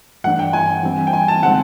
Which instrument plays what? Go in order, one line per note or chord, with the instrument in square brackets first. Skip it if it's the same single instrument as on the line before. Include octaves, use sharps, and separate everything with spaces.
[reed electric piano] G2 E3 A3 D4 [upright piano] F#5
[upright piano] G5
G#5
[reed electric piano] E3 G3 C4
[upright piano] G5
G#5
A5
[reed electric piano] D3 F3 G#3 C4 D#4 [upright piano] F#5